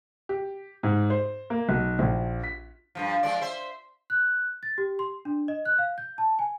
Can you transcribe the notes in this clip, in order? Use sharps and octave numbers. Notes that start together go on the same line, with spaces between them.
G4
G#2
C5
A#3
B1
A#1
B6
G2 B2 F3
F3 G#3 D5
C5 E5
F#6
A6
G4
C6
D4
D#5
F#6
F5
G6
A5
G#5